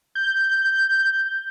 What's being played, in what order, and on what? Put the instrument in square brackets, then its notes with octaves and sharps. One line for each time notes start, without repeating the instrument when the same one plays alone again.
[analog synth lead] G6